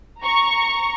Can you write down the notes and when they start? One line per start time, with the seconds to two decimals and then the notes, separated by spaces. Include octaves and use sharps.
0.22 A#5 C#6